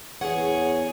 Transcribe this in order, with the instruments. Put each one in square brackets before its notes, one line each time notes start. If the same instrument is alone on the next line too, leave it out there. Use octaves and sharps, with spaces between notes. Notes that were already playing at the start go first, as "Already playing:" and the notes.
[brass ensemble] E2 [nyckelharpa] G#4 [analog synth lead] C#5 [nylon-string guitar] F#5